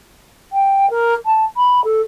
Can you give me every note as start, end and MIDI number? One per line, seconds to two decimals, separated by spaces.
0.52 0.89 79
0.90 1.14 70
1.25 1.44 81
1.57 1.83 83
1.84 2.01 69